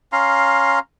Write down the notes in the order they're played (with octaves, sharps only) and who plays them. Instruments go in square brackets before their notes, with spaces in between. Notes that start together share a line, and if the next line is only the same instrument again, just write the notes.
[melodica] C#4 F5 A#5 C6